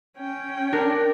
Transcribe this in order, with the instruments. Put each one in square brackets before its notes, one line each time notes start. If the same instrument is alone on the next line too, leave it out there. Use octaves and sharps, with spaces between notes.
[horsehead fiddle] C#4 G5
[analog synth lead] D4 [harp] A#4